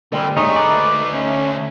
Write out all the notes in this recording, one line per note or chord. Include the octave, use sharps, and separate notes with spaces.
A#2 D3 G3 C4
D2 G#3 A3 D#4 C#5
D#4 B4 D5
C#4